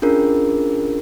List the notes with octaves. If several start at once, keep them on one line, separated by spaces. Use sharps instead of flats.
C#4 D4 F4 G#4 A#4